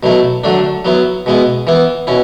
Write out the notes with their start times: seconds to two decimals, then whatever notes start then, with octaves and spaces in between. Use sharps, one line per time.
0.03 B2 F#3 A3 E4
0.44 D3 F#3 A3 D4
0.85 F#3 B3 E4
1.26 B2 G#3 B3 E4
1.67 E3 B3 E4
2.07 B2 C#4 E4